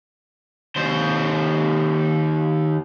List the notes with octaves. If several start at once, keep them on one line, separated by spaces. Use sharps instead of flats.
D#2 C5